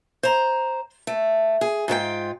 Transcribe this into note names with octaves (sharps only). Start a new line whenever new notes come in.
C5 A#5
A3
G#4
G#2 F4 A4 G5